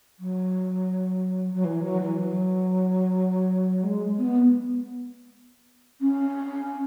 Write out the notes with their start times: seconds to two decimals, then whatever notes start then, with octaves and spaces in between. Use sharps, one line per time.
0.19 F#3
1.53 F#3
1.64 E3
1.83 F#3
2.00 E3
2.19 F#3
3.83 G#3
4.18 B3
6.01 C#4